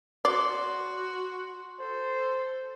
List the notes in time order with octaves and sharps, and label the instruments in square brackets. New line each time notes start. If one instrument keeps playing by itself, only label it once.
[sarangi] F#4 [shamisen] D5 [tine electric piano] C6
[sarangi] A4 [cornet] C5